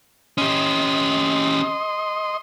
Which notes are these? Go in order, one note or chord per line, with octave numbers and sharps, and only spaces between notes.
C#4 G4 D#5 C6